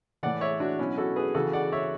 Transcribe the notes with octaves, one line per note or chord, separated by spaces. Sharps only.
A2 E3 D5 F#5
C#5 E5
D4 F#4
B2 F#3 C#4 E4
F#4 A4
G#4 B4
C#3 E3 F#4 A4
D5 F#5
C#5 E5